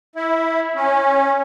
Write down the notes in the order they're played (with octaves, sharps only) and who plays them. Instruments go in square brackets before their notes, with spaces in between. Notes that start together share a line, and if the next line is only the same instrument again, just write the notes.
[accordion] E4
C#4